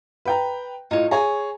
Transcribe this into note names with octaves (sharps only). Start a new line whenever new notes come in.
B4 G5 A#5
A2 D#4 F4 C#5
G#4 C#5 G#5 A#5